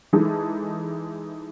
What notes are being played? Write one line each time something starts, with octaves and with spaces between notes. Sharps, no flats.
E3 G#3 D#4 A4